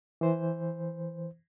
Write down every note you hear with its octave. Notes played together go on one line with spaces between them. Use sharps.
E3 C5